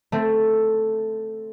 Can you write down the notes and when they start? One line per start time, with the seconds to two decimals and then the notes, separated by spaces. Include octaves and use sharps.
0.12 A3 C4